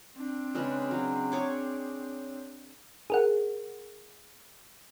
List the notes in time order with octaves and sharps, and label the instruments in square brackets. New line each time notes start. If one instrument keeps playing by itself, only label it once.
[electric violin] C4 D4
[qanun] C#3 G#3 B4
F#3 G#3
G#4 C#5 D6
[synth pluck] G#4 A#4 F#5